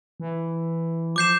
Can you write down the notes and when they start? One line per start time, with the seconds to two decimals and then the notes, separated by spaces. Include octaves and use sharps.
0.20 E3
1.16 F3 D6 G6 C7 E7